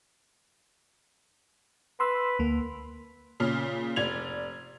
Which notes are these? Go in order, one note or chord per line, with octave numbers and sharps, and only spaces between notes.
B4 C6 E6
D2 A#3
A#2 C#3 F6
F1 D5 G#6 F7